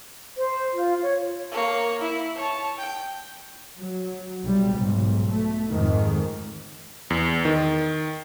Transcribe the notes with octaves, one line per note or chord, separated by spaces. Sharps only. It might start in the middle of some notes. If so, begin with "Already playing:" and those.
C5
F4
C#5
A#3 C#5
E4
C#5 A5
G5
F#3
B1 G3
B1 G#2
A3
F2 G#2 D#3
E2
D#3